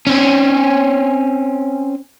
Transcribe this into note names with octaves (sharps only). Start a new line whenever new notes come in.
C4 C#4